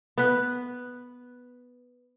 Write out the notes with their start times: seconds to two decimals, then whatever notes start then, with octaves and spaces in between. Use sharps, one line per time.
0.18 B3 B4